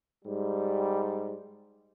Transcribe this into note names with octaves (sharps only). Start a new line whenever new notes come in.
G#2 G3